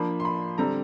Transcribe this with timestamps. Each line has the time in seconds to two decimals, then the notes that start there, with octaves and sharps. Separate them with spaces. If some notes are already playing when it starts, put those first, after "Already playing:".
Already playing: F3 A#3 D4 B5
0.20 C6
0.25 B5
0.58 D3 G3 C4 A#5